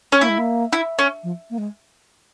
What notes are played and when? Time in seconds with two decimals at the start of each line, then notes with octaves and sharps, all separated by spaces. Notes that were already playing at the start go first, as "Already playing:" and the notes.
0.12 C#4
0.21 A#3 E4
0.29 G#3
0.38 A#3
0.73 E4
0.99 C#4
1.23 F3
1.50 A#3
1.58 G#3